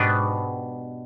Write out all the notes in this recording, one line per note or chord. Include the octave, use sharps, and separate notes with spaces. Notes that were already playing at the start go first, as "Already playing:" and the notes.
Already playing: G#2 B2 B3 D4 G4 B4